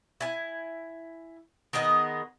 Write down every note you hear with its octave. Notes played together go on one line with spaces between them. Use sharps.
E4 G#5
D#3 G#3 B3 D#5